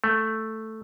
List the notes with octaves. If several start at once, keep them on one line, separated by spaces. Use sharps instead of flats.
A3